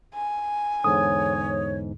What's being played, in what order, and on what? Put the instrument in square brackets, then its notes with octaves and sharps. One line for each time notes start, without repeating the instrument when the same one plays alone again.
[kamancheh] G#5
[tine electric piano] E2 G#2 D3 [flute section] C#5 [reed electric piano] D#6